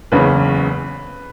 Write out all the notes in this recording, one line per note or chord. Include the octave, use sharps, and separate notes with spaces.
F#1 E2 C#3 B4